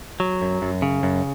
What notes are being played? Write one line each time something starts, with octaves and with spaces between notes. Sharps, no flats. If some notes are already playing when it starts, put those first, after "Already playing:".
F#3
F#2
F#2
C#3
F#2